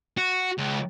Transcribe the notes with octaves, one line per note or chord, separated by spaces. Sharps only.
F#4
C#2